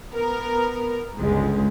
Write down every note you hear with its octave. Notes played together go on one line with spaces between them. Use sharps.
B3 A#4
G1 C#2 G#3